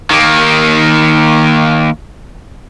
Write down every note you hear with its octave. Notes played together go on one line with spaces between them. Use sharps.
D#3 A#3